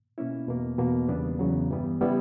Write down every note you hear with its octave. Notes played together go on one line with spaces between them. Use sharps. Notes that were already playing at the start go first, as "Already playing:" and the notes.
B2 A#3 C#4 E4
E2 B2 A#3
E2 B2 A#3
E2 C#3 G3 B3 D4
E2 C#3 F#3
G2 E3 G3 B3
C#3 G3 B3 E4